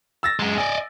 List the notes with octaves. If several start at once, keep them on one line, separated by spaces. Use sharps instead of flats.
E6 A6 A#6
F#2 G#3
D5 D#5 G#5